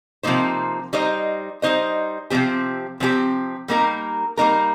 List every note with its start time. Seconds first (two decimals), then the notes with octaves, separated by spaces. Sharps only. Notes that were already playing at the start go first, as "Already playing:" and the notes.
0.23 C3 F3 A#3 D#4 C5
0.93 G3 D#4 C5 D#5
1.62 G3 D#4 C5 D#5
2.30 C3 F3 C4 G4
3.00 C3 F3 C4 G4
3.68 G3 A#3 D#4 A#4
4.37 G3 A#3 D#4 A#4